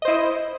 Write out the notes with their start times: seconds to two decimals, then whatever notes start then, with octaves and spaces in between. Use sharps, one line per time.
0.02 D#5
0.05 C5
0.08 E4